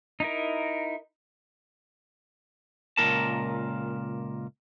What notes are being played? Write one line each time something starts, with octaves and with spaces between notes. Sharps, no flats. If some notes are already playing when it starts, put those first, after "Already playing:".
D#4 E4 A#4
C#2 A#2 G#3 D4 A#4 A5